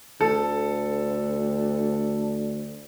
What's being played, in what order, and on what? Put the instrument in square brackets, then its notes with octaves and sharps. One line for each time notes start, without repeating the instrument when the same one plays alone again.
[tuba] D2 [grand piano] A4